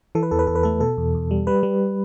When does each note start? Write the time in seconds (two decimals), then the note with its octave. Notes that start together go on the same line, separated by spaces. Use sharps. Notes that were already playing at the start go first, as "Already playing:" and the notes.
0.15 E3 A4
0.23 B4
0.31 E2 A4
0.39 B4
0.47 E2 A4
0.55 B4
0.63 A3 A4
0.80 B2 A4
0.98 E2
1.14 E2
1.31 G3
1.47 G3 B4
1.63 G3